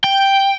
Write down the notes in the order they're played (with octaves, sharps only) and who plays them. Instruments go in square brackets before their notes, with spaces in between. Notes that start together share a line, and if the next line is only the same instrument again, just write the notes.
[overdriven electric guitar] G5